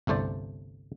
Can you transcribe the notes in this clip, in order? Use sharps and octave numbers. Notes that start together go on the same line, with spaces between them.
G1 C2 A3 C5 D5